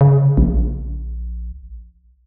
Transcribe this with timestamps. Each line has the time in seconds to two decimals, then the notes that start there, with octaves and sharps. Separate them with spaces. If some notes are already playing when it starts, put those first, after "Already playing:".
0.01 C#3
0.37 A#1